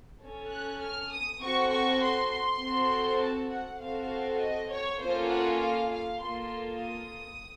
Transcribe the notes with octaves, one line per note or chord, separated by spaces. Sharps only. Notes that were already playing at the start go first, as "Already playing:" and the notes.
C#4 A4
F#6
F6
D#6
C4 F#4 A4 C#6
C#6
C6
C6
C4 F#4 A4
A5
F#5
C4 F#4 A4 F5
D#5
C#5
A#3 C#4 F4 A4 C5
F#5
F5
F5
A#3 F4 A4 C6
D#6